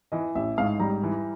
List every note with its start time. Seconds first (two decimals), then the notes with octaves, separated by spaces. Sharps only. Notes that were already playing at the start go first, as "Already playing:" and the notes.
0.12 E3 D#5
0.35 A1 E5
0.58 G#2 F5
0.80 G3 A#5
1.03 E3